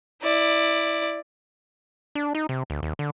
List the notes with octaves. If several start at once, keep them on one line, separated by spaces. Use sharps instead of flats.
E4 D5
D4
D#4
C3
D2
D#2
D3